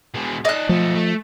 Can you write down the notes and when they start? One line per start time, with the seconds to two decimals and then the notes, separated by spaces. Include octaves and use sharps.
0.14 B2 G#3
0.45 D#4 D5 D#5 F#6
0.69 B1 F3 A3
0.95 A3